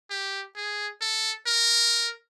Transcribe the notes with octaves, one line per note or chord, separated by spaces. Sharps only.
G4
G#4
A4
A#4